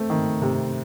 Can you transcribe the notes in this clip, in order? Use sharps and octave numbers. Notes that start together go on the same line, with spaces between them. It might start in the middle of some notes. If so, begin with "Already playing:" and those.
Already playing: A3 C4
D#3
C3